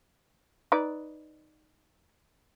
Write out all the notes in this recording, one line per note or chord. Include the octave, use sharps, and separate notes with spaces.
D#4 B4 D5